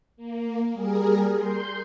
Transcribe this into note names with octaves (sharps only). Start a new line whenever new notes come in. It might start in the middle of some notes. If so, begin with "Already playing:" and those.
A#3
G3 G#4 A#4
C6 G6